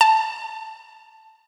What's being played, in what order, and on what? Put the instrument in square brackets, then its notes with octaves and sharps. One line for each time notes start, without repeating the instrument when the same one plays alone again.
[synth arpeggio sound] A5